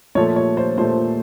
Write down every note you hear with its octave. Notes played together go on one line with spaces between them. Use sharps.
A#2 F3 A3 C#5
C#5
C5
A#2 F3 A3 C5